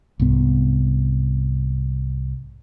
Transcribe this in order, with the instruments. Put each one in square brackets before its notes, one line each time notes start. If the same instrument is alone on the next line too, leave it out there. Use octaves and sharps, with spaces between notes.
[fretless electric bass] C2 G#2 B3